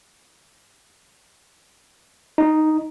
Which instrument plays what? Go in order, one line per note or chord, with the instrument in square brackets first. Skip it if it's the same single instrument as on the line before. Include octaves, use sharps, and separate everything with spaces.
[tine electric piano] D#4